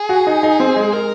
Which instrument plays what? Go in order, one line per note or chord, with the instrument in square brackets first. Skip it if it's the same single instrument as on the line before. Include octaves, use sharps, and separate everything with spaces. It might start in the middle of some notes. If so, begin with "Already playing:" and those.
Already playing: [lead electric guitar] G#4
[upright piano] F#4
D#4
D#4
C4
G#3
[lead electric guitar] A#4